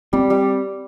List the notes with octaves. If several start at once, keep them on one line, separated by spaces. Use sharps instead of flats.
G3 C4
G3